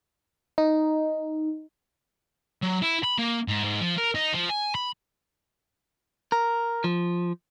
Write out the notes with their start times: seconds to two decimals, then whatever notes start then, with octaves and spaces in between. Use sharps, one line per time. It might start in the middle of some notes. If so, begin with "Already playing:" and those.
0.58 D#4
2.62 F#3
2.82 E4
3.04 B5
3.19 A#3
3.48 G#2
3.64 G#2
3.81 F3
3.97 A#4
4.15 D#4
4.34 F3
4.50 G#5
4.75 B5
6.32 A#4
6.84 F3